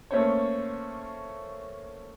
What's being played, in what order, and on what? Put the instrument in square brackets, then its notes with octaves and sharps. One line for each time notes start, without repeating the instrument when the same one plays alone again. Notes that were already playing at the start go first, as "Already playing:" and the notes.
[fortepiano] A3 A#3 C#4 C5 C#5